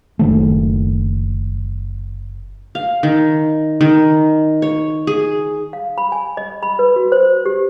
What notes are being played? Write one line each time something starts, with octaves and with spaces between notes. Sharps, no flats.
F#1 D#3 A3
F5
D#3
D#3
C#5
G#4
F5
B5
G#5
D#5
B5
B4
F#4
C5
G4